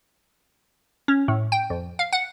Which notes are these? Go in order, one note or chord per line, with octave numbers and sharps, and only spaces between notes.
C#4
A2
G5
F2
F5
F#5